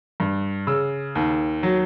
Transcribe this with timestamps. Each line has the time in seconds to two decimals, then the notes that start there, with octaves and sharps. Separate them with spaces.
0.20 G2
0.67 C#3 E6
1.15 D#2
1.63 F#3